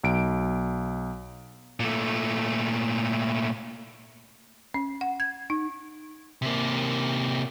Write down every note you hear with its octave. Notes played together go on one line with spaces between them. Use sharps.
B1 D7
A#2 A3
C#4
F#5
G#6
D#4
C3 A#3